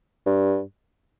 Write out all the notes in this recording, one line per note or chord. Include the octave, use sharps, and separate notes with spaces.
G2